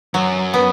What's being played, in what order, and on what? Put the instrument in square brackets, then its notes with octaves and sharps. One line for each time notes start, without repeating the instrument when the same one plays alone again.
[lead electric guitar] F#2 [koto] F#3
[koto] B3